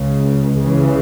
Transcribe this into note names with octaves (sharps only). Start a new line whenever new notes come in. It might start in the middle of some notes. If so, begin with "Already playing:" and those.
Already playing: C#2 C#3
C#3 E3